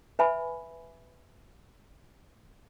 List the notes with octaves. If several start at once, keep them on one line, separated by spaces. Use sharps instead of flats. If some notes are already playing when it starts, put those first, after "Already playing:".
B4 E5 G#5 B5